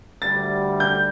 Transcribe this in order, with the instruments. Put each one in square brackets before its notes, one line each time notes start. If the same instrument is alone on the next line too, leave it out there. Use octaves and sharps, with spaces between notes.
[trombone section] D2 D3 G3 [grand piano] A6
[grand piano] G6